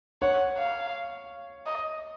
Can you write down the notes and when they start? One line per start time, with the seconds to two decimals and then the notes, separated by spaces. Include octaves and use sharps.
0.22 C#5 F#5
0.58 F5
1.66 D#5